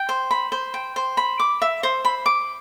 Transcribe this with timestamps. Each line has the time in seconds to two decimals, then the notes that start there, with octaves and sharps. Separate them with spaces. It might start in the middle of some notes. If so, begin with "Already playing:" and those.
Already playing: G5
0.09 C5
0.31 B5
0.52 C5
0.74 G5
0.96 C5
1.17 B5
1.40 D6
1.62 E5
1.83 C5
2.05 B5
2.26 D6